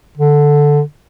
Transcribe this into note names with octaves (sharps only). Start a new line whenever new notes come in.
D3